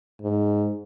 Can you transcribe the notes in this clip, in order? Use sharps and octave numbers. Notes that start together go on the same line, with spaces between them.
G#2